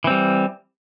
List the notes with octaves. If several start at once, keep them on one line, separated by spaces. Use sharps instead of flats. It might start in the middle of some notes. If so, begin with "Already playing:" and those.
E3 G3 C4